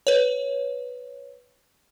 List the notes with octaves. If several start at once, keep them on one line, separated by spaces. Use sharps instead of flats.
B4 C#5